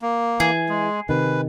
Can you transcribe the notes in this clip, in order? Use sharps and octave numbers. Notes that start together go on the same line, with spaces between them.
A#3
E3 G#4
G#3
C3 D#3 B4